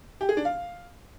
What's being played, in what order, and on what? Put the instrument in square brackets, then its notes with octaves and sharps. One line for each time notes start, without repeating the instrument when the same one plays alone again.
[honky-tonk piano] G4
G#4
D4
F5